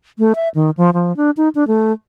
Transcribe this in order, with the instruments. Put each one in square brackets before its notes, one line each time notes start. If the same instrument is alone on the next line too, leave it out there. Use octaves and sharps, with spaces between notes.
[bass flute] A3
E5
D#3
F3
F3
D4
D#4
D4
A3